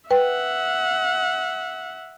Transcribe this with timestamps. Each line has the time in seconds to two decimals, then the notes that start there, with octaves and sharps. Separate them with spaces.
0.11 B4 E5 F#5 G5